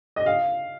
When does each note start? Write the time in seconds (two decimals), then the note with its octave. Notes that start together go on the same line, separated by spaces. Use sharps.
0.16 D#5
0.26 F5